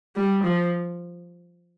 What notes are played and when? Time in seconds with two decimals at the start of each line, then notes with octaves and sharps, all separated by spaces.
0.16 G3
0.44 F3